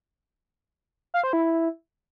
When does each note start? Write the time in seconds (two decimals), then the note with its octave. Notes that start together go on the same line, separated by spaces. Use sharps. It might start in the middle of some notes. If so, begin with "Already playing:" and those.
1.14 F5
1.23 C5
1.33 E4